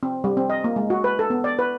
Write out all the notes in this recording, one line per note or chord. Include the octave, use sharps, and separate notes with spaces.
C4
G3
C4
D#5
A#3
G#3
F#4
B4
A4
B3
D5
B4